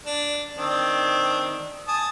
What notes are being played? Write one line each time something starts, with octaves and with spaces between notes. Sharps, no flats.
D4
D#3 C4 D4
G#5 A5 D#6